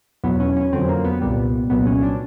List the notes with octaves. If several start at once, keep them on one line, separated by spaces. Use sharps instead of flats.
E2 B2 F#3 B3
C#4
C#4
F2 D3 F#3 C4
A#3
B3
C2 A#2 G3 B3
C2 A#2 F#3 B3
C#4
D4